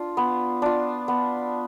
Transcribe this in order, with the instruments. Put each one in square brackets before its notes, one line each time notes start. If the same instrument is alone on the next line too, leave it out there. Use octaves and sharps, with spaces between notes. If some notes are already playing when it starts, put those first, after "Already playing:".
Already playing: [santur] D4 F4
B3
D4 F4
B3